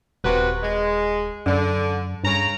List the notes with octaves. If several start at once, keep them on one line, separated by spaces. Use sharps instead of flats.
D#1 C3 F#4 B4
G#3
F#2 D3
G2 C#3 C#4 A#5